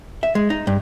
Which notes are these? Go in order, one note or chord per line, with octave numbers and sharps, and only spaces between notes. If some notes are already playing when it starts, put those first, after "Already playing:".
E5
G#3
D#4
G2